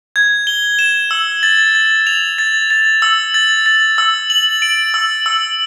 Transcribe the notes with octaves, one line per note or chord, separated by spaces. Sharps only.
G#6
G7
E7
E6
A6
A6
F7
A6
A6
E6
A6
A6
E6
F#7
D7
E6
E6